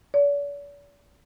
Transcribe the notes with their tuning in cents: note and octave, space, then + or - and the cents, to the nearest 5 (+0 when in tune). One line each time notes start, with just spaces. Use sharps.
D5 -45